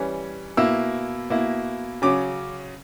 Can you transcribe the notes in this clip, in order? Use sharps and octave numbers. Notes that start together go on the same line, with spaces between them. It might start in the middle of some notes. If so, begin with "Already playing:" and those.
Already playing: E3 G3 C#4
B2 A#3 E4 E6
B2 A#3 E4
C#3 F#3 C#4 D6